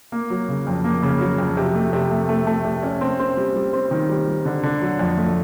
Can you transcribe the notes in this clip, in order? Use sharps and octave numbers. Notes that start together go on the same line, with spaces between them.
A#3
F#3
C#3
F2
A#3
C#3
F#3
F2
C3
A3
C3
A3
A3
A3
C3
C#4
C4
C4
G3
G3
C4
D#3
G3
G3
D3
D3
F#3
F2
A3